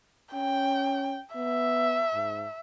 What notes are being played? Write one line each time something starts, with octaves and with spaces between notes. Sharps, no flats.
C#4 G5
B3 E5
G#2